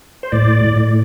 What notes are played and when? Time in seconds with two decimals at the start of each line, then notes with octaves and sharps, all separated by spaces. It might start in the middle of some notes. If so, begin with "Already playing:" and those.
0.23 C5
0.32 A2 D5
0.64 A2